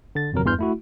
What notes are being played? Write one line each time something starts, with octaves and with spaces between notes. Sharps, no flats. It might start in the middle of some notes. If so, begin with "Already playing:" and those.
D3 A6
G1 F2 C3 F#3 A#4
E2 G2 E3 C6 F6 G6
A3 E4 F#4